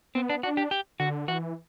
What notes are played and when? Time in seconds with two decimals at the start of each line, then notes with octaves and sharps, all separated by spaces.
0.15 B3 C4
0.29 D4
0.43 D4 F#4
0.57 G4
0.71 G4
1.00 D3 F#4
1.28 E3 F#4